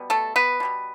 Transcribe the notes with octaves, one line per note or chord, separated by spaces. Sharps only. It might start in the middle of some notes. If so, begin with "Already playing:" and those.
Already playing: B2 G3 B3
A3 A4
B3 B4
B2 G3 B3